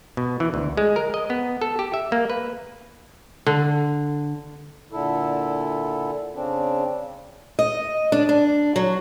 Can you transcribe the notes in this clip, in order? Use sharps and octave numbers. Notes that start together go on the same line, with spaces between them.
B2
E3
D2
G#3
A#4
D#5
B3
A4
G4
E5
A#3
B4
D3
A#2 D3 E4 A4
C#3 C4 D4
D#5
D4
D4
F#3